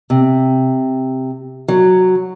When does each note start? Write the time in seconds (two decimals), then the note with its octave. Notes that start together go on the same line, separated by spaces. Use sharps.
0.10 C3
1.68 F#3